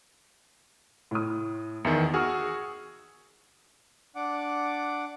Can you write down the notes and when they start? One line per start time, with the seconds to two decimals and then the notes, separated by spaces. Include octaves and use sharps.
1.11 A2 D#6
1.85 E2 D#3 E5 A6 C#7
2.14 F#4 G#4 C#6 E6 F6
4.16 D4 F#5 D6